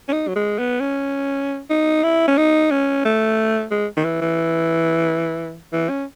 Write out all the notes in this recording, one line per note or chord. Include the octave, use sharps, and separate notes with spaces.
C#4
D#4
F#3
G#3
B3
C#4
D#4
E4
C#4
D#4
C#4
A3
G#3
D#3
E3
E3
E3
C#4